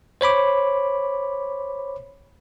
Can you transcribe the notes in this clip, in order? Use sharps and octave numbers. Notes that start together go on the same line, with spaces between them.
C5 C#5 B5 D6